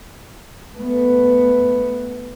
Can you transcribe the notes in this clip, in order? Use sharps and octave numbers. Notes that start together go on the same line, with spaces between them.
A3 B3